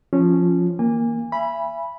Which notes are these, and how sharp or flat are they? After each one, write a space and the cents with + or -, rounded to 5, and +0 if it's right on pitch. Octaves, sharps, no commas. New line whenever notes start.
F3 +0 C#4 -10 F4 +0
E3 -45 A#3 +0 G#5 -30
E5 +35 G#5 -15 B5 -10